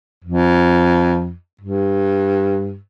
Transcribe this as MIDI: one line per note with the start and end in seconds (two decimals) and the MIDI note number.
0.24 1.34 41
1.61 2.77 43